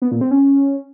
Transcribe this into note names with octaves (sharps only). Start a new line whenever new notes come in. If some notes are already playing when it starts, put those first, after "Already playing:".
B3
A#2
C4
C#4